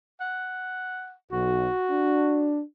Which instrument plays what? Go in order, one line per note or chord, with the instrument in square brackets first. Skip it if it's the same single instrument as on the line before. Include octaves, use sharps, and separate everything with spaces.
[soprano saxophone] F#5
[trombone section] B1 [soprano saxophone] F#4
[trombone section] D4